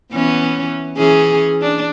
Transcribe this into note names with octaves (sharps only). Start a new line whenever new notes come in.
E3 B3 C#4
E3 C#4 G#4
D4